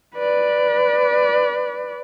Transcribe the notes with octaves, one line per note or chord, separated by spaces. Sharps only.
B4 D5